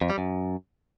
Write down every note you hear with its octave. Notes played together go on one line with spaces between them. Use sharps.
F2
G3
F#2